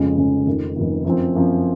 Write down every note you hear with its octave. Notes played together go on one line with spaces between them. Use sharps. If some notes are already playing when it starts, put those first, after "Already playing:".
Already playing: F1 F2 C#3 G#3 C#4
F1 F2 C#3 G#3 C#4
F1 F2 D#3
F1 F2 D#3
F#2 F3 C4
F#2 F3 C4